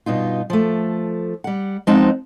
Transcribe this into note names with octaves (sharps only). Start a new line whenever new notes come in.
G2 B2 D#4 F4
F3 A3
G3 F#5
F3 G#3 B3 C4 D#4 A5